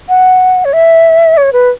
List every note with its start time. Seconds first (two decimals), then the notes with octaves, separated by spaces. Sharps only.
0.09 F#5
0.65 C#5
0.73 E5
1.37 C#5
1.53 B4